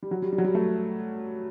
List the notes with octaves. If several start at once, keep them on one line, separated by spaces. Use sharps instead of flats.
G3
F#3
G3
G3
F#3
G3
A3